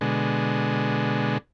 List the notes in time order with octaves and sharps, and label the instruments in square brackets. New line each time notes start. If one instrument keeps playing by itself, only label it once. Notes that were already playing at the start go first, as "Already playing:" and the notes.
[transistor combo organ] B2 D3 G#3